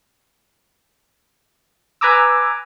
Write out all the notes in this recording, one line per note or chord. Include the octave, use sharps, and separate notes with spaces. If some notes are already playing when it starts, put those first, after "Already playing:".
B4 G#5 A#5 D6 E6